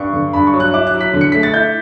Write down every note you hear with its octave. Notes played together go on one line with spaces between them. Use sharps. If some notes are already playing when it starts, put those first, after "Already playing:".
Already playing: G2 C#6
D3
G2 B5
C#6
F#3
F#6
E4 D6
F#6
F#3
B6
D3
C#7
A3 B6
A6
E4 G6